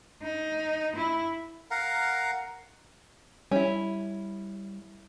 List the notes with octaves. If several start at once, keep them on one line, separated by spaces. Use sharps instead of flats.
D#4
E4
A#4 F5 F#5 A#5
G3 C#4 E4